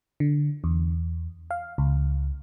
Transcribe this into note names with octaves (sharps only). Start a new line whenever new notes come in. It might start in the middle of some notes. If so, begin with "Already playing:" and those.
D3
E2
F5
C#2